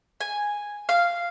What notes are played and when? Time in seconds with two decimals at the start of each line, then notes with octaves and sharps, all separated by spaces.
0.21 G#5
0.89 F5